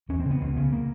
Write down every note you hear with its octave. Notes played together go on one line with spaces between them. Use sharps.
E2 C#4
C4
C#3
B3
C#2
C#3
A#3